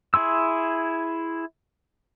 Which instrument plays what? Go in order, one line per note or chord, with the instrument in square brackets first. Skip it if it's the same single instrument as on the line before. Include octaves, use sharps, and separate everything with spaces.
[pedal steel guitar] E4 G#4 C6 E6